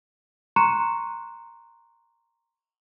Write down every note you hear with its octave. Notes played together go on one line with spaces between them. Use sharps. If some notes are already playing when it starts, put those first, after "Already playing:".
A#5 C6 C#6 F#6 C#7 E7